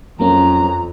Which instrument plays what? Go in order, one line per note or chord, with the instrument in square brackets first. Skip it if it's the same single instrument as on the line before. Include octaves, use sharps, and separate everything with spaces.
[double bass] F2 [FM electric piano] F#3 A#3 C#4 [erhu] A#5